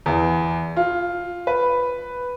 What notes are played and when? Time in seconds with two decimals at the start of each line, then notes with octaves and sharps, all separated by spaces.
0.06 E2
0.77 F4
1.47 B4